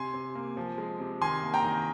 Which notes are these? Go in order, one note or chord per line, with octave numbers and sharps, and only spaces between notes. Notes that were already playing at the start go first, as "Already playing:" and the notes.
Already playing: C3 G#5 C6
C3
A#3
F3
G#3
C3
D#3 G#5 C6
A#3
G5 A#5
D#3